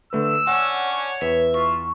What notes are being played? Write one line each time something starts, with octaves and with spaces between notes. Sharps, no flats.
D3 A3 B4 E6
C#4 D4 F#5
C#5
E2 B4 E5
F4 C#6